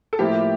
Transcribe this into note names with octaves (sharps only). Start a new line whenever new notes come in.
A4
A2 F3 A#3 E4 G4